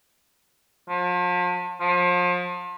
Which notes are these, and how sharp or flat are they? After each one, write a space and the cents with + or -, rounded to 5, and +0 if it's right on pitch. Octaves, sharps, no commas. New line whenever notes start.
F3 +40
F3 +35